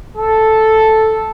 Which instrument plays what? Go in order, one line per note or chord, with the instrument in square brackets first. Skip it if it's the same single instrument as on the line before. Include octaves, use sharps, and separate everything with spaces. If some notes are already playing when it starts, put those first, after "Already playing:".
[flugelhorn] A4